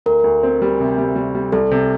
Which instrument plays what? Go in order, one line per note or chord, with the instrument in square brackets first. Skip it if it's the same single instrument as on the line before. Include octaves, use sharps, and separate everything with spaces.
[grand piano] D2 [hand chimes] A#4
[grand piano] D2
C4
G3
C3
G3
G3
G3
[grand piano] C2 [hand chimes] A4
[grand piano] C3